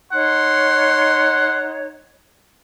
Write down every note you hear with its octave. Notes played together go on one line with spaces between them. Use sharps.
D#4 C#5 F#5 C6